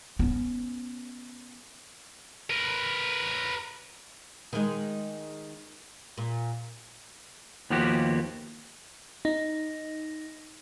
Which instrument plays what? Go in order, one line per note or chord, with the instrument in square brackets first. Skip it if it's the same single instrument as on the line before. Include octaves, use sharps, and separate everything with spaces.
[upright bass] B3 C#4
[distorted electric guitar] A#4 B4
[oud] D#3 G#3
A#2
[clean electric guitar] D#2 F3 A#3 B3 F#4 G4
[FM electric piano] D#4